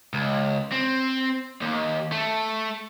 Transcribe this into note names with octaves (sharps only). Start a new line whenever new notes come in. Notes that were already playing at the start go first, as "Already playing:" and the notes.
C#2
C4
D#2
A3